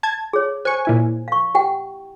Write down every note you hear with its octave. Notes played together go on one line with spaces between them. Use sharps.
A5 G#6
G#4 C#5
C5 G#5 C#6
A#2 E4 G#5
F5 C#6
G4 F#5 G5